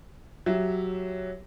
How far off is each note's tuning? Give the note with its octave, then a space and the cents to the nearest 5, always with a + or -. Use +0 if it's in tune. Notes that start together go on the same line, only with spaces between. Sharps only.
F#3 +0 G4 +0 E5 +0